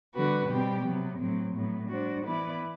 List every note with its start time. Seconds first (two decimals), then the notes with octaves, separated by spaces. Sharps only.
0.14 D3 G3 B3 F#4 B4
0.49 B2 G3 C4 G4
0.84 C3 F#3 B3
1.19 A2 F#3 C4
1.55 A2 F#3 B3
1.89 G3 D4 F#4 C5
2.25 E3 B3 E4 B4 D5